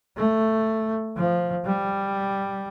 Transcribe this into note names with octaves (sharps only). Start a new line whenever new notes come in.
A3
F3
G3